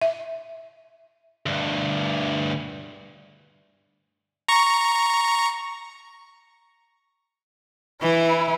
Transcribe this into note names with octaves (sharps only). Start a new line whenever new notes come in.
E5
D2 G2
A#5 C#6
E3 E4